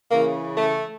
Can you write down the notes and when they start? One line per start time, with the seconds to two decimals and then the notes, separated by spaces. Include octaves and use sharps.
0.10 C#3 E3 A#3
0.57 A3